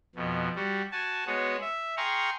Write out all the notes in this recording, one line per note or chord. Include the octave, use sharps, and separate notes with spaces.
F2 B2
G3 F#4
F#4 G#5 A5
G#3 B3 F#4 C#5
E5
G#4 F5 G5 A#5 C6 C#6